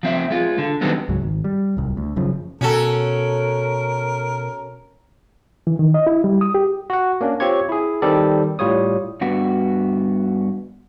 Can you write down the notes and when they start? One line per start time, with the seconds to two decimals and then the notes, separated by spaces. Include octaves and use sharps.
0.03 F3 C4 E5
0.31 G#3 F4
0.58 D3
0.81 D3 D#3 F#3 G3 B3 C4
1.09 C#2 G#2 F#3
1.22 G#1
1.44 G3
1.77 D1 C2
1.97 D2
2.16 F#1 F#2 C#3 F3
2.61 B2 C#4 F#4 A4 A#4
5.67 E3
5.79 D#3
5.94 D#5
6.07 E4
6.24 G3
6.41 D#6
6.54 G4
6.90 F#4 F#5
7.21 A#3 C#4 D4
7.40 C4 F4 G4 C#5 C#6 G#6
7.69 E4 G#4
8.02 D#3 G3 C4 A4 D5
8.59 A2 G3 F4 C#5 D#6
9.21 G2 D3 B3 F#4